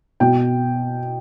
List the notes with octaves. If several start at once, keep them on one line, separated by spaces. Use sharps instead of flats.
B2 G5